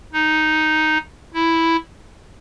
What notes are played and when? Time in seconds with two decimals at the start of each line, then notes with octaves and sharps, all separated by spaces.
0.13 D#4
1.34 E4